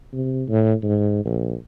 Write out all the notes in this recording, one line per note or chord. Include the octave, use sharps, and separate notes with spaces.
C3
A2
G#2
A#1